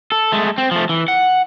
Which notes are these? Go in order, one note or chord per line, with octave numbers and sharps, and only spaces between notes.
A4
G#3 A3
C4
F3 A3
E3
F#5